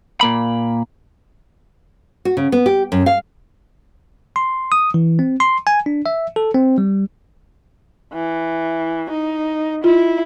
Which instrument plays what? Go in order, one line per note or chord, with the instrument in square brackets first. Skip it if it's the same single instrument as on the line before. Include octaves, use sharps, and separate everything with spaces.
[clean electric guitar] A#2 A#3 B5
[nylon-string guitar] F#4
C#3
B3
G4
F#2
F5
[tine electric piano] C6
D#6
E3
C4
C6
G#5
D4
E5
A4
C4
G3
[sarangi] E3
D#4
[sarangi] E4 [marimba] F4